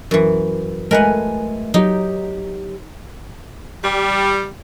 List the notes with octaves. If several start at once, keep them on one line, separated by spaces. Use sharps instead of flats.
F#2 E3
G#3 A3 A#4 B4 F#5 G#5
F#3 D#4 G4
G3